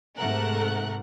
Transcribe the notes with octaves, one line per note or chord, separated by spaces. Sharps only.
G#2 C3 A3 A#4 F#5 F#6